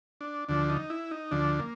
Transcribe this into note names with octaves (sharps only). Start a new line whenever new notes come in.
D4
D2 D3 F3 D4
D#4
E4
D#4
D2 D3 F3 D4
A#3